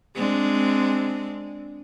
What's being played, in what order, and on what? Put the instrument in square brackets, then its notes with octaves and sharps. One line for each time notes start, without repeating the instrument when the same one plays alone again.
[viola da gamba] G#3 C4 D4